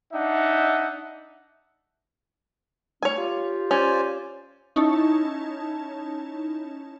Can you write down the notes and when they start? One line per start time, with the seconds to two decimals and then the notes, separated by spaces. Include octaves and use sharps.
0.13 D4 D#4 E5 F#5
3.03 G3 A3 C#4 C#5 G#5
3.17 F4 G4
3.71 C#4 C5 D5 G#5
4.76 C#4 D#4 E4 C#5 A5